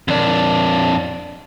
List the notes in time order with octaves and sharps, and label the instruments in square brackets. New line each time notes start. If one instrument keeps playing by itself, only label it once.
[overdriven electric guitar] F2 D4